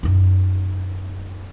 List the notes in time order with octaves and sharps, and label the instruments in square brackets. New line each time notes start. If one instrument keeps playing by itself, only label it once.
[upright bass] F#2 D#4